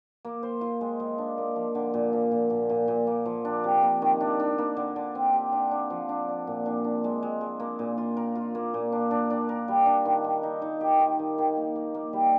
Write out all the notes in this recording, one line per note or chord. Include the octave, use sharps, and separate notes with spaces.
A#3
C5
F4
G#3
G#3
D4
A#3
F3
D3
A#2
F3
A#2
A#2
A#2
A#2
A#3
F3
D4
C3
A#3
D#3
D4
D4
A#3
D3
D3
C4
G4
D4
D4
F3
D4
D4
A#2
D4
D4
G#3
G#3
G#3
A#3
A#2
F4
A#4
F4
A#3
A#2
D4
D4
D4
A#4
G3
D4
D#3
D#3
D#4
D#4
G4
D#3
D#3
D#3
A#3
A#3
A#3
G3